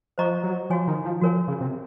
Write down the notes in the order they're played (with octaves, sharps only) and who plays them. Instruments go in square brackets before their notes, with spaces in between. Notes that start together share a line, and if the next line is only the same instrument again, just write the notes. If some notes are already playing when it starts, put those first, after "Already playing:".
[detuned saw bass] F3 [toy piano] C5 D#5 A#5 C#6
[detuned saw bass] F#3
[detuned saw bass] F3 [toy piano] F#4 C#5 G#5
[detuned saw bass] D#3
F3
[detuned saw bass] F3 [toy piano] F#4 A#4 C#5 G#5
[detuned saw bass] C#3
C3